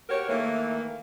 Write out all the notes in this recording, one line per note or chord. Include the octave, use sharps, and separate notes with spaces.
F#4 G4 A#4 C#5
D#3 E3 A3 A#3